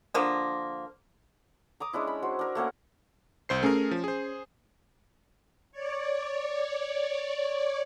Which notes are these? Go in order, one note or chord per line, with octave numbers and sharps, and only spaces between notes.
D3 F3 A#3
A#5 D6 D#6
G#3 C#4 D4 E4
B5
F#4 C5
D4 A#4
A3 A#3 C#4 F#5
C2 C5 C7
A3 C#4 G#4 A#4
F3
G#4 C5
C#5 D5